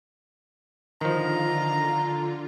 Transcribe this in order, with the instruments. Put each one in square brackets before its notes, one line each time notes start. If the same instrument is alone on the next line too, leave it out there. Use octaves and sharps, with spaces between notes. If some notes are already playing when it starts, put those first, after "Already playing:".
[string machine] D3 F4 [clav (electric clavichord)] D#3 F3 [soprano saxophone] A#5